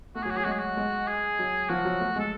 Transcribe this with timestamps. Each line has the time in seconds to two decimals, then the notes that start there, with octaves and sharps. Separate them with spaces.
0.15 A3 F#4
0.23 F#3 G#4
0.30 F#4
0.36 F#3 G#4
0.44 G#3 F#4
0.52 G#4
0.59 F#4
0.77 G#3
1.08 G#4
1.39 F#3
1.69 F3 F#4
1.85 F#3
2.00 A3
2.16 G#3
2.19 A4